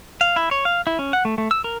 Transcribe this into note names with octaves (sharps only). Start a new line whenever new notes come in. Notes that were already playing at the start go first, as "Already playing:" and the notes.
F5
E4
C#5
F5
E4
C#4
F#5
A3
A3
E6
A#4